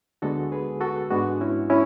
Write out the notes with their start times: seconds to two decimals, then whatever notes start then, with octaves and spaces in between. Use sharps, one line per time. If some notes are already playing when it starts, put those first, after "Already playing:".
0.22 D2 D3 G#3 B3 F#4 A4
0.52 G#4 B4
0.81 F#4 A4
1.10 G#2 G#3 B3 D4 F#4
1.41 C#4 E4
1.70 C#4 E4